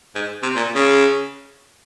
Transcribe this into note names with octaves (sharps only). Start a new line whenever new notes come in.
G#2
C3
A#2
C#3